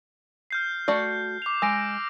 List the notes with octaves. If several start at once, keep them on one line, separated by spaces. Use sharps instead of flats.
F6 G6 C7
A3 F#4 D5
D6 F7
G#3 E6 A#6 D7